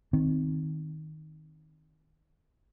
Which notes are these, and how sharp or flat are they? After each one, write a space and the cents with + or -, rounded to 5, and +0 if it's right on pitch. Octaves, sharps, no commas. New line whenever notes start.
D#3 +0 C4 -5